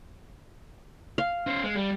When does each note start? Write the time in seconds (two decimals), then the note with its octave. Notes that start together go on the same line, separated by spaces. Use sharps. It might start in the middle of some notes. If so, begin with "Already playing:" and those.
1.18 F5
1.47 C#4 C5
1.64 G#3
1.76 G3